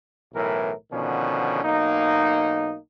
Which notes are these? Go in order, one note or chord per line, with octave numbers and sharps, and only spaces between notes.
B1 A2 E3 A#4
B2 D3 D#3 F3 C#4
B1 A#3 D#4